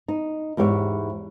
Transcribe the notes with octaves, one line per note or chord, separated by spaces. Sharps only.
D#4
E2 G#2 G4 C#5 D5